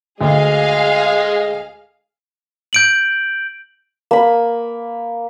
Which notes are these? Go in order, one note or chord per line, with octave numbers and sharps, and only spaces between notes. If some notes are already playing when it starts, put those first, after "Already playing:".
D2 G#3 G#4 D#5 F5
G6 D7 F#7
A#3 B5